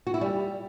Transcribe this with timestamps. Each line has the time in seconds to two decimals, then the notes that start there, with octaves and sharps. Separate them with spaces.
0.07 F#4
0.14 E4
0.21 G3